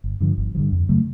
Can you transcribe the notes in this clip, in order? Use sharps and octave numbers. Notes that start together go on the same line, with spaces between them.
G1
G2 D3 F3
G1
F3
G2 D3
F2
C#3 F#3 A3